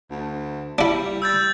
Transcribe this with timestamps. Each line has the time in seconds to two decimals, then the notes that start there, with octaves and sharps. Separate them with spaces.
0.10 D2
0.78 G3 D4 E4
1.22 E6 G6 A6